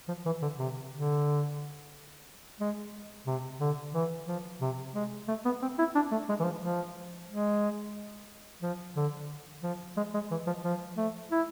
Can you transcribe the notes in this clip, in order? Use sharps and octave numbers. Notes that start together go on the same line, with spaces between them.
F3
E3
D3
C3
D3
G#3
C3
D3
E3
F3
C3
G#3
A3
B3
C4
E4
D4
A3
G#3
E3
F3
F3
G#3
F3
D3
F3
G#3
G#3
E3
F3
F3
A3
E4